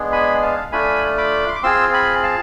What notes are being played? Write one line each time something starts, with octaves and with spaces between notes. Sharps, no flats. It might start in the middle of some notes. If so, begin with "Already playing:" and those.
Already playing: G#3 B3 D4 G#4
G#5 B5
F5 A5
A3 D4 F4 G#5 B5
B5 D6
C6
D6
C4 F4 G#4 C6 E6
G#5 B5
F5 A5